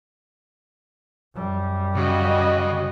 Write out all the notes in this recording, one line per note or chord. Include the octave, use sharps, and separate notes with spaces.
F#2 G3
C#3 F#4 D#5